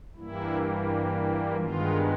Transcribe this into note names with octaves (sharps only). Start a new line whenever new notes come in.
G2 E3 G3 A#3 E4
G2 D#3 G#3 B3 F4